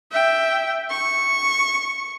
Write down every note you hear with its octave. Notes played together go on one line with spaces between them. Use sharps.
E5 G5
C#6